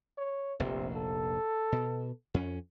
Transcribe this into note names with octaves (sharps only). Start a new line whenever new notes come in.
C#5
F1 A#1 C3
A4
B2
F2 C#4